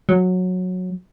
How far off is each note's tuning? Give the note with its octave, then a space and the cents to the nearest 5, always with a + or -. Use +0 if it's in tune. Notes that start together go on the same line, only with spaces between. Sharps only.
F#3 -15